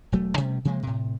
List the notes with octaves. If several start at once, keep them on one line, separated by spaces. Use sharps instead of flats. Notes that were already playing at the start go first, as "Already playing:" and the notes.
E1 F#3 A3
B2 G3 A3 C#4
C3 F3 G#3 A#3
A2 C3